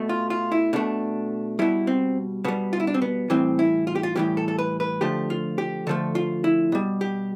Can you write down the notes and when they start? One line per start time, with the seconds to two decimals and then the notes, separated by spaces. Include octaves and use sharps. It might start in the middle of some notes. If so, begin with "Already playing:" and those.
Already playing: B2 A3
0.09 F4
0.30 F4
0.52 E4
0.73 B2 A3 D4
1.59 B2 G3 E4
1.87 C4
2.44 B2 G3 B3
2.73 F4
2.80 E4
2.87 D4
2.94 C4
3.02 B3
3.30 A2 E3 G3 C4
3.59 E4
3.87 F4
3.95 G4
4.03 F4
4.16 A2 E3 G3 G4
4.37 A4
4.48 A4
4.59 B4
4.80 B4
5.01 D3 F3 A3 G4
5.30 F4
5.58 G4
5.87 D3 F3 A3 A4
6.15 F4
6.44 E4
6.72 B2 G3
7.01 G4